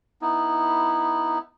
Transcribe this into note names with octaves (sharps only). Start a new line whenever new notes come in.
B3 D#4 E4